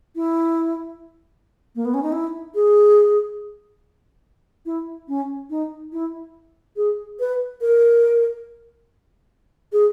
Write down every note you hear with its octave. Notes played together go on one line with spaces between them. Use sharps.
E4
A#3
B3
C#4
D#4
E4
G#4
E4
C#4
D#4
E4
G#4
B4
A#4
G#4